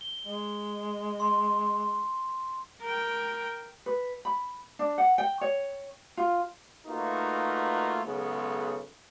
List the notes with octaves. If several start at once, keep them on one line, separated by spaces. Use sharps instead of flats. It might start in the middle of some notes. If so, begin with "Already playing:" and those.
G7
G#3
C6
A#4 G5
B4
B5
D4
F#5
G5
C#5
F4
A3 A#3 D#4 F4 F#4 B4
B1 C#3 G#3 B3 G#4 A4